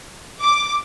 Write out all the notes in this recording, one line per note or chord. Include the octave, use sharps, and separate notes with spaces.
D6